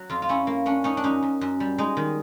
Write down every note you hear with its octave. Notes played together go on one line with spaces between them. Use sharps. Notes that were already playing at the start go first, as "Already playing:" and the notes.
Already playing: F#3
F2 F4
F4
C#4 E4
A#3
C#4 D4
C#4 D#4
D4
F#2 D#4
F#2
F#2
G3
G#3 D#4
D#3